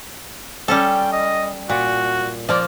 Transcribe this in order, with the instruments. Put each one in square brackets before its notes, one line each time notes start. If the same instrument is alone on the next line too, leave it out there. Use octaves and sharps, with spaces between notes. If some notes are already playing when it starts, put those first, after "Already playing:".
[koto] G3 C#4 A4 [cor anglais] G5
[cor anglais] D#5
[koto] A#2 [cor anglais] F#4
[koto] F3 A#3 [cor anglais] D5